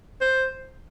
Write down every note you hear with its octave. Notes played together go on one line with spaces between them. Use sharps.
C5